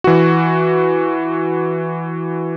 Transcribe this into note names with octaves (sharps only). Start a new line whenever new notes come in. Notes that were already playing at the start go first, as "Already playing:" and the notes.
E3 F#4